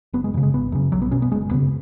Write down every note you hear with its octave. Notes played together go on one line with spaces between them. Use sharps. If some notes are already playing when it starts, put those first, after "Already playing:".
F#1 B3
G#3
F#2 C#3 D#3
G#3
G#1 B3
F#2 C#3
B1 F#3
B3
B2 C#4
B3
F#1 G#3
F#2 C#3 B3